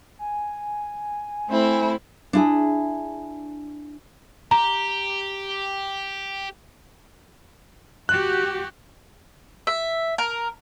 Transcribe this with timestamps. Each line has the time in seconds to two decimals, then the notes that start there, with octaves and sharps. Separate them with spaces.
0.19 G#5
1.49 A3 C4 E4
2.33 D4 E4 G#4
4.51 G4 A#5
8.09 F#4 G4 F#6
9.67 E5
10.18 A#4